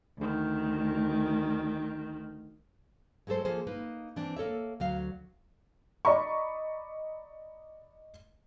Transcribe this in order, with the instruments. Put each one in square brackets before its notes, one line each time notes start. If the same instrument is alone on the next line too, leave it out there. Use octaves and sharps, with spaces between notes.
[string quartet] D2 D#3
[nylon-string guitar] F#3 G#3 A3 A4 C5
F3 A#3 G#4 A4 C5
A#3 D#4 B4
E3 C4 D4
A#3 A4 C#5 E5
D2 F#3 F5
[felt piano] D5 D#5 A#5 B5 C#6